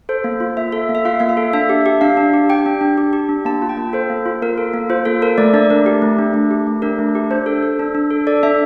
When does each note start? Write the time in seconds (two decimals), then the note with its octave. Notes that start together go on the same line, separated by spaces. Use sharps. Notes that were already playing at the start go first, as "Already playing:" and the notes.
0.09 A4 C5
0.24 A#3
0.40 F4
0.57 A#3 E5
0.72 A4
0.89 A#3
0.95 E5
1.05 F4 F5
1.19 A#3 F5
1.29 E5
1.37 A4
1.53 D4 E5
1.69 G4
1.86 G4
2.01 D4 F5
2.17 D4
2.34 G4
2.49 G4 G5
2.66 D4
2.81 D4
2.98 G4
3.13 G4
3.29 D4
3.45 A#3 A5
3.62 F4
3.69 G5
3.77 A#3
3.93 A4 C5
4.10 A#3
4.26 F4
4.42 A#3 A#4
4.58 A4
4.73 A#3
4.90 F4 C5
5.05 A#3 A4
5.22 A4 A#4
5.38 A3 D5
5.54 D4 D5
5.70 A3 A#4
5.86 G4
6.02 A3
6.19 D4
6.34 A3
6.51 G4
6.67 A3
6.82 D4 A#4
6.99 A3
7.15 G4
7.31 D4 C5
7.46 A4
7.63 A4
7.79 D4
7.95 D4
8.11 A4
8.27 A4 D5
8.43 D4 E5